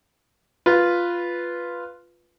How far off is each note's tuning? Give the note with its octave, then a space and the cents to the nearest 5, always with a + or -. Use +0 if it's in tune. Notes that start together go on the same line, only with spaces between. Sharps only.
F4 +0 B4 +0